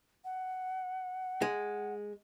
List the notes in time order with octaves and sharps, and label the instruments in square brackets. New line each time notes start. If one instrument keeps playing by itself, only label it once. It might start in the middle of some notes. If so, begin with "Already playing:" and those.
[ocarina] F#5
[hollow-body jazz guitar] G#3